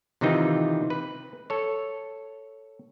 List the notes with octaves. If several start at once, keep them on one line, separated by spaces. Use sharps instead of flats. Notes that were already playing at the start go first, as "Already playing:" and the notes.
C3 D#3 E3 C4 D#4 F4
B4
A4 C#5